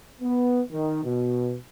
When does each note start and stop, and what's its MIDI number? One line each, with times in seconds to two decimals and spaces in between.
0.21 0.62 59
0.73 1.01 51
1.05 1.56 47